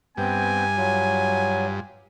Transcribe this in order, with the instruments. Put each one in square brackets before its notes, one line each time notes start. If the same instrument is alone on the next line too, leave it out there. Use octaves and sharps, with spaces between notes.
[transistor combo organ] G2 [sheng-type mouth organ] B3 C4 G5 [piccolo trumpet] G#5
[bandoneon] F#3 [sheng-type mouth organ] F4